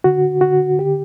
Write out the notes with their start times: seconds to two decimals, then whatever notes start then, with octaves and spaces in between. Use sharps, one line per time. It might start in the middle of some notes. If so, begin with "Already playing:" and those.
0.04 D3 F#4
0.41 D3 F#4
0.78 D3 G4